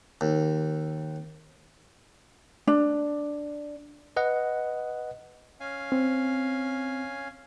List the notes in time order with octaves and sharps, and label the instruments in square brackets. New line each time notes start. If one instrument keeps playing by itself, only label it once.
[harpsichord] D#2
[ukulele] D4
[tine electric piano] B4 D#5 F#5
[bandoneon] C#4 F5 G#5
[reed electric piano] C4